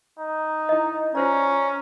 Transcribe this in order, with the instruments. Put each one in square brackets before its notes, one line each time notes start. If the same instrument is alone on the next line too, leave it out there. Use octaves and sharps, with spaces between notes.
[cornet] D#4
[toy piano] E4 D#5
[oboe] C#4 [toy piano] F4 C5 D5 [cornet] A#5